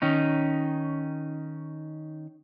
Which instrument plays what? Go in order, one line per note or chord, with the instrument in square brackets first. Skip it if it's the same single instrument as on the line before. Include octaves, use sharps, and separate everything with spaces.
[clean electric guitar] D#3 C#4 D#4